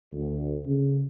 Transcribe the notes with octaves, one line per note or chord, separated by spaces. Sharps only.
D2
C#3